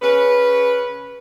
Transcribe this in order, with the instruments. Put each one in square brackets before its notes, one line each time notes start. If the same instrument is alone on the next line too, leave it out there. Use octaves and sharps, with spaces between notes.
[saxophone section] C#3 C#4 B4